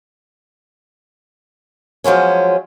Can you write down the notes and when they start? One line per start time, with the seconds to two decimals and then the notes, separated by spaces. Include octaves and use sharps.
2.04 F3 F#3 G#3 C#4